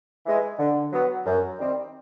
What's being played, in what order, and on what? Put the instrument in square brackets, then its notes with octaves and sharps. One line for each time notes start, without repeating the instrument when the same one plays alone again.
[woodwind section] E3 G#3
D3
F#3 B3
F#2
D#3 G3 C4